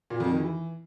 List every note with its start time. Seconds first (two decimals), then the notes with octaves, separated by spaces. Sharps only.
0.10 A#2
0.20 F2
0.30 D#3
0.40 E3